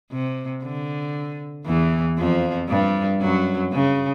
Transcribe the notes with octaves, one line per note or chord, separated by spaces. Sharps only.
C3
D3
E2 E3
F2 F3
G2 G3
F#2 F#3
C#3